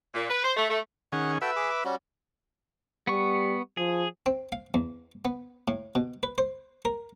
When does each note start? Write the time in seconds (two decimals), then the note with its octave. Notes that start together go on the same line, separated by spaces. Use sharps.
0.14 A#2
0.30 B4
0.44 C5
0.57 A3
0.70 A3
1.12 D#3 C#4 G#4 F#5
1.42 F#4 A4 B4 E5 G5
1.56 G#4 D6
1.70 D6
1.85 G3 C#4 F#4
3.07 G3 B3 C#6
3.77 F3 G#4
4.26 C4
4.52 F5
4.74 E2
5.25 B3
5.68 A2
5.95 B2
6.23 B4
6.38 C5
6.85 A#4